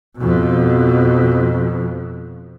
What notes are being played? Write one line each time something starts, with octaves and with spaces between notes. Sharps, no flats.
F2 B2